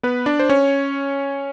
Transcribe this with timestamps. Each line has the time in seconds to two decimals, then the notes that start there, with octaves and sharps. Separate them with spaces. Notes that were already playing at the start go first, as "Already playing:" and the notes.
0.03 B3 B4
0.26 D4 D5
0.39 C5
0.49 C#4 C#5